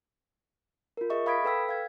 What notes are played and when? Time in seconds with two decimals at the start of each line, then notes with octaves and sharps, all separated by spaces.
0.97 F4 A#4
1.10 G#4 D#5 E5 C#6
1.26 F5 B5 D#6 G#6 B6 D7
1.45 A4 B4 G5 E6 B6
1.69 F5 G#6